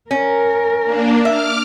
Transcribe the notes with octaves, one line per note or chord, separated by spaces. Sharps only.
C#4 A#4
A#3 D4
E5 D6 F6